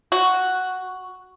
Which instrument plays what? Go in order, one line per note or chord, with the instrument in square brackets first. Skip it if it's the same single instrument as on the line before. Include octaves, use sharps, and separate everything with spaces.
[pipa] F#4